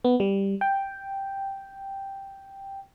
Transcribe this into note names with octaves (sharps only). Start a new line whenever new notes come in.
B3
G3
G5